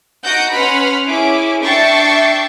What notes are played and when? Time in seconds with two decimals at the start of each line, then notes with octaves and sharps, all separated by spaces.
0.24 D#4 F#4 F#5 G6 A#6 D7
0.53 C#4 B4 F#5 B5 C6 F6
1.08 C#4 E4 G#4 D6
1.64 D4 E5 G5 C#6 A6 C7